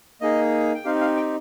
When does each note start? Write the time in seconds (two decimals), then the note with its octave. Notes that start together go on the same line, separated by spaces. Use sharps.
0.21 A#3 D#4 G#4 D#5
0.75 G5
0.85 C4 D#4 G4 F5
1.01 F5
1.17 G5